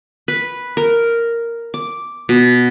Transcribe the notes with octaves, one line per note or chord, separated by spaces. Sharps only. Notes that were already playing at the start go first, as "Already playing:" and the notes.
B4
A#4
D6
B2